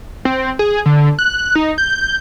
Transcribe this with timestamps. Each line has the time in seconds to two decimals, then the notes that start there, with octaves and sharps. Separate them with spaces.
0.25 C4
0.59 G#4
0.86 D3
1.19 F#6
1.55 D#4
1.78 G6